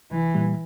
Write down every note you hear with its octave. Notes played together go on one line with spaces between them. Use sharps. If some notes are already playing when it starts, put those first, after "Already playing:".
C2 E3
A#2 G3